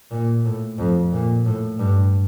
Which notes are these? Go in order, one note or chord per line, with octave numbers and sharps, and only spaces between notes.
A#2
A2
F2
A#2
A2
G2